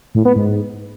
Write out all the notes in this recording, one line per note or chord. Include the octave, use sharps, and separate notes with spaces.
A2
B3
G#2